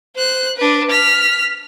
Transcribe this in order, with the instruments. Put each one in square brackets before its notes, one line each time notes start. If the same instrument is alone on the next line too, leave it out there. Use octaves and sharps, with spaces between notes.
[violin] C5 F#6
D4 B4
F6 B6